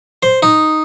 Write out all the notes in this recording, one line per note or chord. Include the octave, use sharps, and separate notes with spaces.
C5
D#4